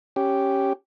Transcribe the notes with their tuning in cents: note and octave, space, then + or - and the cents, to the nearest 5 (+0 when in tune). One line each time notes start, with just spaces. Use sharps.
C#4 -5 G4 -5